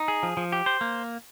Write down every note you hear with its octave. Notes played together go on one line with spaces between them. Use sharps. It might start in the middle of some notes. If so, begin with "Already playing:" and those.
Already playing: D#4
G#4
F3
F3
G4
C5
A#3